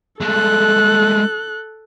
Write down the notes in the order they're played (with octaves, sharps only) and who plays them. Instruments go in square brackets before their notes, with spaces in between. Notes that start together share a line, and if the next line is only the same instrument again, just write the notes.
[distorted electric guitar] G#3 A3 [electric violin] A4 F#6